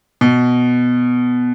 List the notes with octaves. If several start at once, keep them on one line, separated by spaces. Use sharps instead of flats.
B2